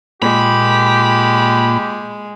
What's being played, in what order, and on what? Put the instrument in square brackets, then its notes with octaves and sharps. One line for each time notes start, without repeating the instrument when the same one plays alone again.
[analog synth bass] A#2 [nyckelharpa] G#3 [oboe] G4 [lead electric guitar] B5